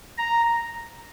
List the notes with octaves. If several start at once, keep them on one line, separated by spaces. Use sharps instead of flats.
A#5